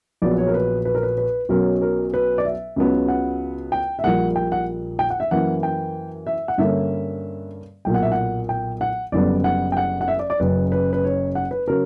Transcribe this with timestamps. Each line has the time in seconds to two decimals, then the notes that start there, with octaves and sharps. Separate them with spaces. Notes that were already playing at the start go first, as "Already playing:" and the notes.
0.22 A#1 A#2 F#3 B3 D5
0.38 C#5
0.47 A#4
0.54 B4
0.85 B4
0.95 A#4
1.03 B4
1.18 B4
1.49 B1 B2 F#3 C#4 A#4
1.82 A#4
2.14 B4
2.38 D5
2.45 E5
2.76 C#2 C#3 F#3 B3
3.08 F#5
3.72 G5
3.99 E5
4.04 A#1 A#2 G3 A#3 F#5
4.36 G5
4.52 F#5
4.99 G5
5.10 F#5
5.20 E5
5.31 F#2 E3 A#3 F#5
5.63 G5
6.27 E5
6.48 F#5
6.58 G2 D3 A#3 C#4 E5
7.85 B1 A#2 A#3 G5
7.94 F#5
8.02 E5
8.12 F#5
8.49 G5
8.81 F#5
9.12 F#1 F#2 D3 G3 B3 D5
9.44 F#5
9.72 G5
9.77 F#5
10.01 F#5
10.08 E5
10.19 D5
10.30 D5
10.40 F#1 F#2 C#3 B4
10.72 B4
10.93 B4
11.04 C#5
11.35 F#5
11.51 B4
11.68 C#3 F#3 A#4